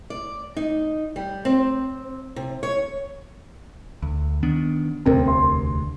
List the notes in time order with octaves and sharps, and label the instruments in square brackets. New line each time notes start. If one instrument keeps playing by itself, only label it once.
[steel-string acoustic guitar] D5
D#4
G3
C4
C3
C#5
[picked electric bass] D2
D#3 B3 D4
[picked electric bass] E1 D2 C3 [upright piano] C4 A#4
[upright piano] C6